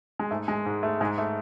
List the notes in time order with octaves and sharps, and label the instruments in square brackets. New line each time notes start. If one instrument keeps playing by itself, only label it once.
[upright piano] G#3
G#2 A3
G#3
G#2
A3
G#2 G#3
A3